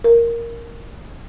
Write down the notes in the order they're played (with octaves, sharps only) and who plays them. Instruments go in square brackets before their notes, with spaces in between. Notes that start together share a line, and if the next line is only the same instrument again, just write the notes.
[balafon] A#4